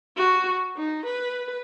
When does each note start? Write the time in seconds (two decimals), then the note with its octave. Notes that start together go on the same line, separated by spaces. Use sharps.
0.17 F#4
0.77 D#4
1.05 B4